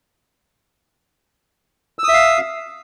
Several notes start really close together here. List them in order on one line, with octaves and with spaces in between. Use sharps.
E6 D#6 E5 F5